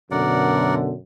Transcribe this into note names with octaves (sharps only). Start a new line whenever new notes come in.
F#2 B2 D3 A#4 D5 F#5